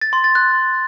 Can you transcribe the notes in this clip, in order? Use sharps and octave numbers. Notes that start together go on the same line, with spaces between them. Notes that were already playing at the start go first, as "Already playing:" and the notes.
A6
C6
A6
F#6